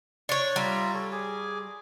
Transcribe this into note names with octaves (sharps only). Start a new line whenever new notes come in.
D4 C#5
G3 F4 E5 A#5
A4 C#5
G#4 G#5 D6